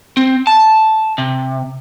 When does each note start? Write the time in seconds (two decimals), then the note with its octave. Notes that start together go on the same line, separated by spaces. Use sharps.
0.17 C4
0.47 A5
1.18 C3